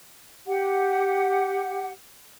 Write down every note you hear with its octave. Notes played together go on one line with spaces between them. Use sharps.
G4 F#5